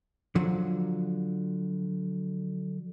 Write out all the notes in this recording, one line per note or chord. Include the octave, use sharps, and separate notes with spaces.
D3 F3 F#3